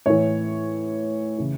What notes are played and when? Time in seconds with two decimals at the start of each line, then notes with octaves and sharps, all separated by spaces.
0.06 A2 E3 C#5
1.38 C#3 E3